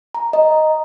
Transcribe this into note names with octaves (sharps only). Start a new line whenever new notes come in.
A#5
D#5